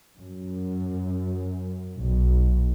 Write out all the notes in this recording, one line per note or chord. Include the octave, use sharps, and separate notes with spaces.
F#2
B1